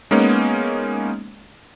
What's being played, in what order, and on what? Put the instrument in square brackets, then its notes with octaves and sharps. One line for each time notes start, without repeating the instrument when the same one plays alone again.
[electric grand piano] G#3 A#3 B3 C#4 D#4